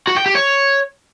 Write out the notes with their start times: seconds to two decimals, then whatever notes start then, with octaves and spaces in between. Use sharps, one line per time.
0.07 F#4
0.17 G5
0.26 G4
0.35 C#5